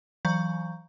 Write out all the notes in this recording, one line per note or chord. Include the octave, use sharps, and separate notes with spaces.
E3 F#3 F5 A#5 C#6 G6